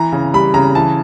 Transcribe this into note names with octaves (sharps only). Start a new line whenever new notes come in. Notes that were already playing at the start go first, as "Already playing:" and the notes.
Already playing: E3 A#5
C#3
G3 B5
C#3 A#5
E3 A5